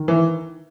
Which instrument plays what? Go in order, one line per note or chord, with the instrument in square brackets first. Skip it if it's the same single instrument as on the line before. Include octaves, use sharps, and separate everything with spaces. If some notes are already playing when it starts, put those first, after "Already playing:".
Already playing: [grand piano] D#3
[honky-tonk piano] E3